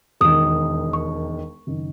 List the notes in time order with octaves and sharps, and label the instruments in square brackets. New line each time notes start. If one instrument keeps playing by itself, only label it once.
[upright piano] E1 D#2 D#3 [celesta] D#6
[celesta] C#6
[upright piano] F#1 D#3